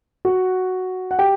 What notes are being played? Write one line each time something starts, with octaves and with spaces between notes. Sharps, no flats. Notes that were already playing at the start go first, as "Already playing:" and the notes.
F#4 F#5
F#5
G4 G5